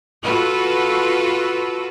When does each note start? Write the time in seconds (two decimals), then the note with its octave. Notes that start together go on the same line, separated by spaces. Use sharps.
0.23 F4 F#4 A4 B4